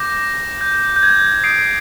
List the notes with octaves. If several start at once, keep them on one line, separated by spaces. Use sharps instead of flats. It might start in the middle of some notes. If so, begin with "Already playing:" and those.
Already playing: D6 G6 A#6
G6
G6
G#6
D#6 G6 C7 D7